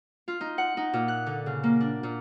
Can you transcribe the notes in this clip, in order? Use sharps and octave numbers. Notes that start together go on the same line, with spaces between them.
F4
D#4
F#5
D#4
A#2
F#6
D3
C#3
A#3
D4
A#2